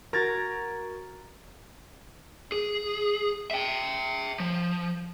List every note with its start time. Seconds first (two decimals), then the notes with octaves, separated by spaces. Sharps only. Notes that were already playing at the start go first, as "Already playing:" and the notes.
0.13 F#4 A#4 A#5 G#6 A6
2.52 G#4
3.51 E5 G5
4.40 F3